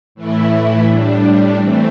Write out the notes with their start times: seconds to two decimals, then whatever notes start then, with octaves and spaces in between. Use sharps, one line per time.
0.15 A2 E3 A3 E4
0.85 A2 G3 D4
1.57 E3 A3 C4